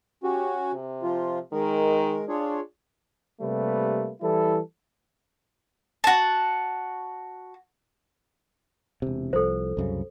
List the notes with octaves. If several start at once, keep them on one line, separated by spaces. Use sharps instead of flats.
C#4 F#4 G4
C3
F3 F4
D#3 G#3 A#4
D4 F4 G#4 C#5
C3 G3 A3 A#3 B4
E3 G3 E4 A4
F#4 A5
E1 C3
C2 F3 A4 C5
C2 F#2 C#3